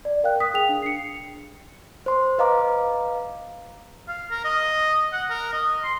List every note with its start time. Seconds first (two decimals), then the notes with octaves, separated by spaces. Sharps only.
0.05 D5
0.23 A#4 F5 G5 F#6
0.40 D#6 B6
0.54 G#4 G5 F7
0.69 D4
0.82 C7 C#7
2.06 C5 C6
2.38 B4 D#5 F5 A#5 D6
4.08 F5
4.31 A#4
4.44 D#5
5.13 F#5
5.30 A#4
5.53 D#5
5.84 C6